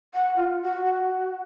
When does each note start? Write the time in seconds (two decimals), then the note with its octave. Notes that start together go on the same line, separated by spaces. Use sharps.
0.14 F#5
0.36 F4
0.63 F#4
0.85 F#4